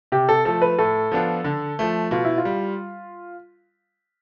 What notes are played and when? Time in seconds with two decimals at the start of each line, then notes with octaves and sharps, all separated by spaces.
0.12 C3 G4
0.29 A4
0.45 F3 A3 A4
0.62 B4
0.78 A2 A4
1.12 F3 B3 D4 F4
1.44 D3
1.79 F3 A3
2.11 B2 F4
2.25 E4
2.38 F4
2.45 G3